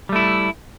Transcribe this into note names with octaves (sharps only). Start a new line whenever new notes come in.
G3 A3 E4